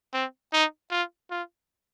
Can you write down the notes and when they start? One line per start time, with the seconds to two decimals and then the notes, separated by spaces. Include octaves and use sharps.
0.13 C4
0.53 D#4
0.91 F4
1.31 F4